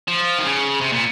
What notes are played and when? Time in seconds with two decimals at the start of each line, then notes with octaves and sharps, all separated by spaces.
0.08 F3
0.38 D#3
0.44 C#3
0.81 C3
0.92 A#2